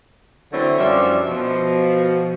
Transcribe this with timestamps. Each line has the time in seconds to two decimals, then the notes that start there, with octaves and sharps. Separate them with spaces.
0.53 D3 E3 F#3 A3 C4 E4
0.79 F#2 F3 G3 D4 E5
1.29 B2 F3